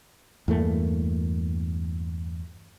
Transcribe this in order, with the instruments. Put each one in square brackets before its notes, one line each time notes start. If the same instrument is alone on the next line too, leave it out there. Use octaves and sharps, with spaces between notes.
[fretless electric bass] E2 G2 A3 A#3